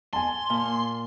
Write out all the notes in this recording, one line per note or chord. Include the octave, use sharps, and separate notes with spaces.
G#5 A5 C6
A#2